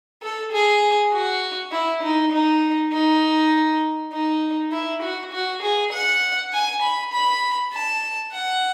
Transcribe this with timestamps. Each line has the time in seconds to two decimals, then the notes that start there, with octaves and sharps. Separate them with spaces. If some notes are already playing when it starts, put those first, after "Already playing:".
0.22 A4
0.53 G#4
1.13 F#4
1.72 E4
2.03 D#4
2.32 D#4
2.93 D#4
4.12 D#4
4.72 E4
5.02 F#4
5.33 F#4
5.63 G#4
5.93 F#5
6.53 G#5
6.82 B5
7.13 B5
7.73 A5
8.32 F#5